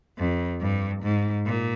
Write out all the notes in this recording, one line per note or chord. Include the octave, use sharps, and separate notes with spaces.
F2
G2
G#2
A#2